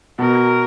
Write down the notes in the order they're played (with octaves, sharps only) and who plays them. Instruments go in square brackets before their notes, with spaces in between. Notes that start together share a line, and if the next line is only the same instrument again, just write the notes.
[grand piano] B2 [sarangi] A#4